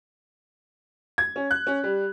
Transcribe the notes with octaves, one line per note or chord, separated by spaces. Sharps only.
G#6
C#4
F#6
C#4
G3